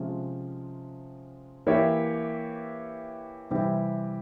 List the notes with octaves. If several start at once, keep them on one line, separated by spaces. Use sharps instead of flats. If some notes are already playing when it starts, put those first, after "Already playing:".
Already playing: C3 F3 G#3 C#4
E3 A#3 E4 G4 C#5
C3 E3 G3 C4 G4